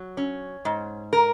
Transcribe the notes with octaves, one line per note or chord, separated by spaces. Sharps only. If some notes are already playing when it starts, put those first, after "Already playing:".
Already playing: F#3
C#4
G#2
A#4